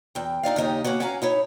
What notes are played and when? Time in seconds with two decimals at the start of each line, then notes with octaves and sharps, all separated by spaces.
0.15 E2 G5
0.43 D3 D#4 D5 F5
0.56 D#2 C#3 D#4 G4 D#5
0.84 A#3 B3 C#4 F#4
1.00 C#4 F5 F#5 G#5 A#5
1.22 D#4 E4 C#5